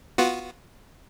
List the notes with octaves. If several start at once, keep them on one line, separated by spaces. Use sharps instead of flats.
B3 F4 F#4